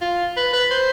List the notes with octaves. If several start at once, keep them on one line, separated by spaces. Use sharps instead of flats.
F4
B4
B4
C5